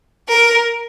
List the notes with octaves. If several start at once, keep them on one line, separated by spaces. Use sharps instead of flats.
A#4